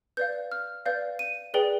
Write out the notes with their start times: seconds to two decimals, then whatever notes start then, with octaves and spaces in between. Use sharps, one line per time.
0.17 B4 D5 F5 G6
0.52 F6
0.86 B4 D5 F5 G6
1.19 D#7
1.54 G#4 B4 D5 G5 G7